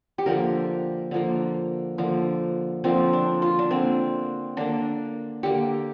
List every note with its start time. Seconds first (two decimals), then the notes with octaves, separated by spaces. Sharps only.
0.18 G4
0.26 D3 F3 A#3 A#4
1.11 D3 F3 A#3
1.98 D3 F3 A#3
2.84 D3 F3 A#3 C4
3.13 D4
3.42 F4
3.59 D4
3.71 D3 A#3 C4
4.57 D3 A#3 D4
5.43 D3 A#3 G4